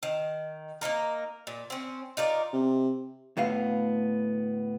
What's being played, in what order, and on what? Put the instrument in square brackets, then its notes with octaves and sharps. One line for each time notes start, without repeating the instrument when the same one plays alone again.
[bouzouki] D#3
A#3 B3 D#4 A#4
A#2
C4 C#4
D#4 F4 A#4 D5
[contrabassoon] C3
[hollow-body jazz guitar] D2 A2 B3 F5